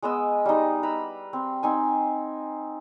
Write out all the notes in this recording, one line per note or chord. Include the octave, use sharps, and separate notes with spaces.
G#3 B3 D#5 E6
G3 D#4
B4 A#5 B5 E6
C4
C4 D#4 G#5